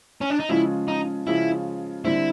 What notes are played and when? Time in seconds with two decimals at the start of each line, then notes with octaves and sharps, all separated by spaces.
0.21 C#4
0.30 D4
0.40 D#4
0.49 C#3 F3 G#3 C#4 E4 F4
0.88 D#4
1.27 C#3 F3 G#3 C#4 E4 F4
2.05 D3 G3 C4 E4